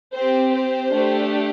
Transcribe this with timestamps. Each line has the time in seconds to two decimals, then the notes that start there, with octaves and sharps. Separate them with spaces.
0.14 C4 G4 C5
0.53 C5
0.92 A3 D4 G4